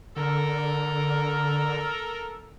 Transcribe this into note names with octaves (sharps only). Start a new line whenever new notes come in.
D3 A4 A#4